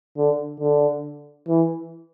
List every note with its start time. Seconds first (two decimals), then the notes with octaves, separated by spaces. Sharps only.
0.17 D3
0.60 D3
1.48 E3